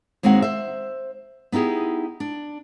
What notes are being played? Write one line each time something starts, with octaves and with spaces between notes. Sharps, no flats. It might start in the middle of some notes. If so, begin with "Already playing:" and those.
D#2 G#3 C4 D#4 F#4 F#5
C5 E5
B3 D#4 E4 G4 G#4
D4